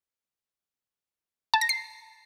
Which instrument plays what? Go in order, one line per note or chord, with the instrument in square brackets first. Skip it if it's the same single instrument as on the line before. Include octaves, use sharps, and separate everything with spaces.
[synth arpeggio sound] A5
A#6
C7